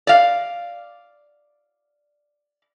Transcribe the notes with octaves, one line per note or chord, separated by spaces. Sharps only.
D5 F5